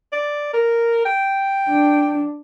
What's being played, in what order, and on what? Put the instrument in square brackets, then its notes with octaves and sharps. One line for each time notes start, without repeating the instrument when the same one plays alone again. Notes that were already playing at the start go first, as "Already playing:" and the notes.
[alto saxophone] D5
A#4
G5
[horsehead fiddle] D4